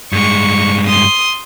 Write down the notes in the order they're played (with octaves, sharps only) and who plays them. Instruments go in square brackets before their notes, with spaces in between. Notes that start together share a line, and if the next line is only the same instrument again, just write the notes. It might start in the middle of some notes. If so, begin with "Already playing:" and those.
[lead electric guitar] G2 G#3 [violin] C#6
[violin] C6 D#6